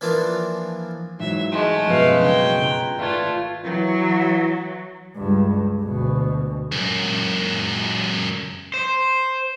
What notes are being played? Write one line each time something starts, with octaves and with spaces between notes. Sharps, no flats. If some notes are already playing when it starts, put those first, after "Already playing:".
E3 F3 A#3 D4 F4
G#2 E3 F#3 E5
G#3 A3
F#2 B2 F3 B4 E5 F5
C#3 F#3 D4 G5
F4 B4 A#5
G#1 A3 F4 B4 D5 F5 G#6
E3 F#3
C#2 G2
D2 B2
C#2 F#2
C5